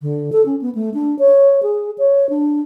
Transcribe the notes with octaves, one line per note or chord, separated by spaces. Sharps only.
D3
A4
C#4
B3
A3
D4
C#5
G#4
C#5
D4